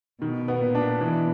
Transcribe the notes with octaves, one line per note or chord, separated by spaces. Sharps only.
B2 D#3
B3
A#2
D4
B2 E3